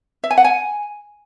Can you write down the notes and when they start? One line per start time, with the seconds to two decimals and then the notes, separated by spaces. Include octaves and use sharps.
0.24 E5
0.31 G#5
0.38 F#5
0.44 G#5